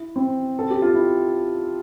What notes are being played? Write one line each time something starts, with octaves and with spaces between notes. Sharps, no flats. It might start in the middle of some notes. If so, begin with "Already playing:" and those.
Already playing: E4
C4
A4
G4
F4
E4